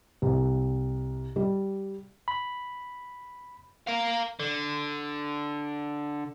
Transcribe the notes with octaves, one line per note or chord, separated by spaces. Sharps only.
C2
G3
B5
A#4 F5
D3